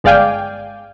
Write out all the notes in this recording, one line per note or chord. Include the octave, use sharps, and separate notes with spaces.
G1 G#3 D5 F5 G5 G#5